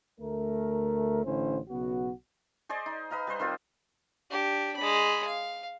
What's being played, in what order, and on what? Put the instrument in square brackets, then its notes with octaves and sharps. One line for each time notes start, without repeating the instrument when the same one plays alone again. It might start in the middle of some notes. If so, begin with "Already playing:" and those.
[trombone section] D2 A3 A#4
A1 D3 A3 C#4 E4 C5
B1 C#3 B3 F#4
[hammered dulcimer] G#4 C5 D5 D#5
D#4
B4 D#5 F5 A#5
G3 B4 C5
D#3 C4 F4 G4
[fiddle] D4 G4
G#3 B5
F5